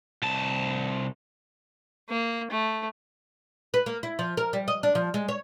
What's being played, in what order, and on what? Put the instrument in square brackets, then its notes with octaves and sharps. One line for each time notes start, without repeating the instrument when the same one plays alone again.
[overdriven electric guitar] C2 A5
[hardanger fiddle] A#3
A3
[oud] B4
A#3
E4
F3
A#4
G3
D#5
D4
F3
G#3
C#5